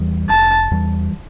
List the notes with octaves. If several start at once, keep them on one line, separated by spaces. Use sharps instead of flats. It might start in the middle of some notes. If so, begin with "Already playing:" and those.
Already playing: E2 E3 G3
F1 A5
E2 E3 G3